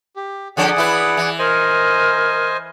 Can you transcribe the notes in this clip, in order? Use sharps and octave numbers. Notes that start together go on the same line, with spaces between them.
G4
D3 F3 C#4 G#4 D5 F#5 D#6
E3 E4 B4
E3
A#4 C5 D#5 G#5